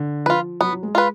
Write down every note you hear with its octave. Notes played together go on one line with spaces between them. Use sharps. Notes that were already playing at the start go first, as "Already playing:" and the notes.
Already playing: D3
F3 F4 B4
F#3 B3
F#3
G#3
F4 B4